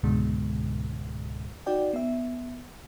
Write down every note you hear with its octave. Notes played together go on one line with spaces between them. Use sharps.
C#2 G#2 B2 D3 G#3
D#4 F#4 D5 G5
B3 E5